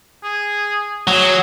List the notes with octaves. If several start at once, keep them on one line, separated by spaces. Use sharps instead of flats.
G#4
F#3 G#4